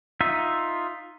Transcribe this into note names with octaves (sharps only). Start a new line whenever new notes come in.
D#4 F4 E5